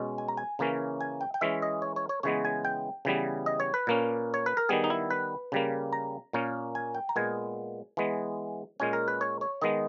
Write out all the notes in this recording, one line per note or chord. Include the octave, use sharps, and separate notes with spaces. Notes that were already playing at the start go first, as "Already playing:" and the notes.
Already playing: B2 G#3 C#4
G#5
A#5
G#5
C#3 E3 A#3 C#4
G#5
G5
G5
E3 G#3 C#4 E5
D#5
C#5
C#5
C#5
C#3 E3 G#3 B3 C#5
G#5
G5
C#3 E3 G3 B3
D#5
C#5
B4
A#2 A#3 C#4
C#5
B4
A#4
D#3 G3 B3 G#4
D#4
E4
B4
C#3 G3 A#3
A#5
A#2 A#3 C#4
G#5
G5
A#5
A#2 G#3 B3 G#5
E3 G#3 B3
A#2 G#3 C#4 G#5
A#4
B4
C#5
C#5
D#3 G#3 B3 D#5